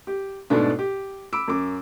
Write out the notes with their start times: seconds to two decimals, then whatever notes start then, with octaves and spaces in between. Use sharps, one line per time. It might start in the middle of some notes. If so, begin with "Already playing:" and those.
0.07 G4
0.50 G#2 B2 A3 D4
0.79 G4
1.33 B5 D6 E6 D7
1.48 F#2 D6